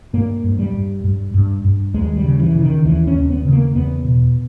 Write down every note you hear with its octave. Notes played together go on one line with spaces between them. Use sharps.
G2 A#3
G2
G3
G2
G2
G2
G2
D#2 G#3
G3
C#3
E3
C#3
D#3
D#2 E3
C#4
D#2
B3
C#3
A#3
E2 B3
B2